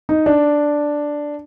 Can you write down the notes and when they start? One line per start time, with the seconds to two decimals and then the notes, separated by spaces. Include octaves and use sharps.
0.09 D#4
0.26 D4